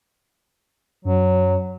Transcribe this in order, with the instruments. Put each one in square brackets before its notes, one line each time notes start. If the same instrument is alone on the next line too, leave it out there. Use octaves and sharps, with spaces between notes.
[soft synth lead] F#2 [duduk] F#3